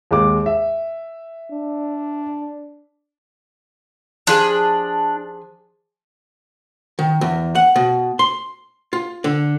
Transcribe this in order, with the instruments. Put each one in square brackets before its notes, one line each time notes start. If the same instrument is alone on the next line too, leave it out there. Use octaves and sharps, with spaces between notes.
[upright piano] D#2 G#3 D6
E5
[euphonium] D4
[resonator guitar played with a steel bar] F3 G4 G#4 [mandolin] D4
[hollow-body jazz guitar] D#3
E2
F#5
B2
C6
F4
D3